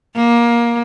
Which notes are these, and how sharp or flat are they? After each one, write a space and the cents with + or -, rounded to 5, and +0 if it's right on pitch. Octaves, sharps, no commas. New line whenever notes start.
A#3 +20